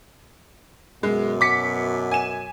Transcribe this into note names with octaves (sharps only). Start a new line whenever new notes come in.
F#2 B2 G#3
D6 B6 C#7
G#5 E7